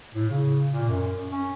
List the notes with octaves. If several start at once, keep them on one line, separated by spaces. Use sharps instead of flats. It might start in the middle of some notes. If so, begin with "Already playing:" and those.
A2
C#3
A#2
F#2
C#4